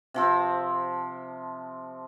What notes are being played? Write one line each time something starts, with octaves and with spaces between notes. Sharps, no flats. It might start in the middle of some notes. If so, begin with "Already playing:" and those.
C3 F3 C4